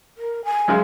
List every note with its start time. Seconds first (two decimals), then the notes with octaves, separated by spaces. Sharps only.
0.18 A#4
0.45 G#5
0.68 F#2 C#3 G#3